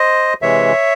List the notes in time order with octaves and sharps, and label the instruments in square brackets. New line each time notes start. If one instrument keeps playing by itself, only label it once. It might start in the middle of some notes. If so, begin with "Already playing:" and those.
Already playing: [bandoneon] C5 D#5
C3 E3 G#3 C#5 E5